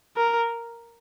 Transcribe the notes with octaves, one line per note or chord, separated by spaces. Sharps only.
A#4